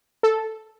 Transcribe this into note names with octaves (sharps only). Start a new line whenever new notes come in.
A4